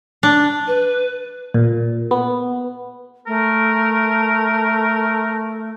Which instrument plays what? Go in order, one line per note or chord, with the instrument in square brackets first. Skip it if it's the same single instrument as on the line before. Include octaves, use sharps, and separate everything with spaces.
[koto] D4
[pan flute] B4
[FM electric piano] A#2
B3
[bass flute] A3 [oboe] A#4